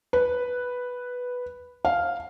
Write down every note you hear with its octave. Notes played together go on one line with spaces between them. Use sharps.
B4
F5